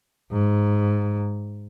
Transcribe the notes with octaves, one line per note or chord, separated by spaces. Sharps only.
G#2